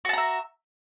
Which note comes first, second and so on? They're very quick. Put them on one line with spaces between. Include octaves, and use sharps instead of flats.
F#4 A5 A#5 E5